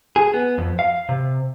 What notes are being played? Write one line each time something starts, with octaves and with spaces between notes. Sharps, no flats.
G#4
B3
F2
F5
C3